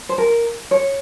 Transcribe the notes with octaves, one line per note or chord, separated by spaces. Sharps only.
C5
A#4
C#5